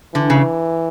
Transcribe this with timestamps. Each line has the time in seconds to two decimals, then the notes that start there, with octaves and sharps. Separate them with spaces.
0.15 D3 E3
0.30 C#3